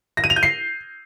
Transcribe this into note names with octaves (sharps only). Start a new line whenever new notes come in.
A#6
D#7
F7
G6
C7